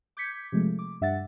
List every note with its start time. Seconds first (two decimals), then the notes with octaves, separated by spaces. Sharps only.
0.17 D6 G6 G#6 B6 C#7
0.52 C3 F3 G#3 A3
0.79 D6
1.01 G2 E5 F#5 A6